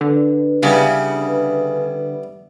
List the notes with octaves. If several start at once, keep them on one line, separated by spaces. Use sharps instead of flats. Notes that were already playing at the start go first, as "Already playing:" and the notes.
D3 B4
C#3 G3 B3 E4